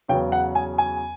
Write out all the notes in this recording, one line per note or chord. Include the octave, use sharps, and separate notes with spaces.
E2 C#3 F#3 B3 G5
F#5
G#5
G#5